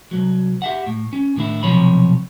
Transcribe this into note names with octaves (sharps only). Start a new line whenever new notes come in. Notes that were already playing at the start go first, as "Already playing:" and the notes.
C2 F#3
G4 E5 F#5
A2
C#4
A2 D#3 D4 E4
B1 C3 F3 C#5 B5